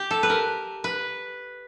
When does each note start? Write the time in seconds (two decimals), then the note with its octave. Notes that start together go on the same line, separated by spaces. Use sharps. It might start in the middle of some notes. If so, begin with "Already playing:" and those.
Already playing: G4
0.11 A4
0.23 B4
0.30 A#4
0.84 B4